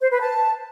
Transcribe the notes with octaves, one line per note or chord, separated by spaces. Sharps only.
C5
B4
A5